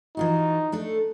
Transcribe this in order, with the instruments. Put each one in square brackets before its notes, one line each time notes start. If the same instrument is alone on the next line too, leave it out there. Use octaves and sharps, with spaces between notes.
[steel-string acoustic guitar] E3 F4 F#4 [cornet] D#4
[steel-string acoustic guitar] A3 D4 A4